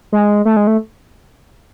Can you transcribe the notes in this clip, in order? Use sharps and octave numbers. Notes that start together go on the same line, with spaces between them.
G#3
A3
G#3
A3